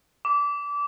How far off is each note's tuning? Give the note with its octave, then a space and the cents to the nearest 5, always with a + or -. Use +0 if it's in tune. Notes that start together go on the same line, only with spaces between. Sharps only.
D6 -25